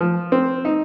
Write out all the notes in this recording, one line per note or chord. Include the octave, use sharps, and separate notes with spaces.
F3
C4
D#4